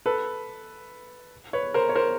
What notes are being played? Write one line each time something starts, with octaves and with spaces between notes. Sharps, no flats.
A4 B4
B4 C#5
A#4 C5
C#5
A#4 C5